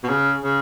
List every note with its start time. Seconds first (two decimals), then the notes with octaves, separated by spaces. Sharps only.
0.04 B2
0.09 C#3
0.44 C#3